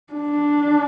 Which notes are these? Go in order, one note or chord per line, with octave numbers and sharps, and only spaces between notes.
D4